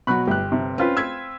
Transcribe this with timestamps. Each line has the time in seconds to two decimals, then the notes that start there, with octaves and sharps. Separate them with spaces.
0.07 B2 F#3 F#4 B5 C#6 F#6
0.27 G1 G4 F#6
0.52 C3
0.78 C4 C#4 F4 B4
0.97 E6 G#6 B6